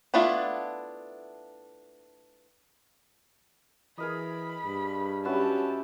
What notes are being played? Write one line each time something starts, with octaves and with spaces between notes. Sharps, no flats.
A3 B3 D4 E4 F4
E3 G#4 A#4 D#5 B5
G2
F#3 C#4 E4 G4 B4 A5